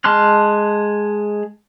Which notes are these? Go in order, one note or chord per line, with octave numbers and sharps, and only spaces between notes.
G#3 A5 C6 F6 F#6